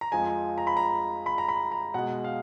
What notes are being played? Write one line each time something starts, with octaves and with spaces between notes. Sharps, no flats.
A#5
F2 F3 G#3 G#5
A#5
B5
A#5
B5
A#5
B5
A#5
B2 G#3 F#5
F5